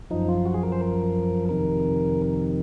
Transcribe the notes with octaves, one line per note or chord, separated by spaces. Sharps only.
F#2 F3 D#4
F4
F#4
G#4
A#4
C5
A#4
F2 C3 D#3 A#4